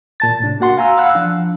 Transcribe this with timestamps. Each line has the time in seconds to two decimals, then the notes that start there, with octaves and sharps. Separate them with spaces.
0.20 A#2 A5 A6
0.40 A2 C3 D4
0.60 A#3 F#4 F#5 C6
0.77 F5 G#5 A#5 E6
0.97 F5 F#5 B5 E6 F#6
1.15 F3 D4